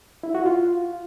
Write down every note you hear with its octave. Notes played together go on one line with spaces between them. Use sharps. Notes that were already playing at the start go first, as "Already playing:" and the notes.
E4
F#4
F4